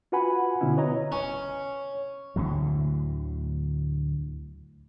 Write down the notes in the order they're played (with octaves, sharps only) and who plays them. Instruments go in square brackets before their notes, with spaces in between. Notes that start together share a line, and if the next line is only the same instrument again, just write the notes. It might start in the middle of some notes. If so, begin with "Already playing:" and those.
[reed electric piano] F4 F#4 B4 F#5 G#5 B5
B2 D3 B3 C#4 E4
B4 C#5 D#5 A#5
[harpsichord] C#4
[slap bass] D2 A2 D3 F#3